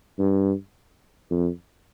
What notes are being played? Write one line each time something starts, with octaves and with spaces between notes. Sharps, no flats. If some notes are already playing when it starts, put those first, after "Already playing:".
G2
F2